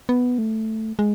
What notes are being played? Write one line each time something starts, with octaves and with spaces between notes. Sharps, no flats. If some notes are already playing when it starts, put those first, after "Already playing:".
B3
A3
G#3